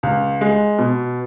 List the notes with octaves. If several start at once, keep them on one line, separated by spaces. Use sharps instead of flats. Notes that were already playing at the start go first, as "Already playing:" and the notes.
C#2
G#3
B2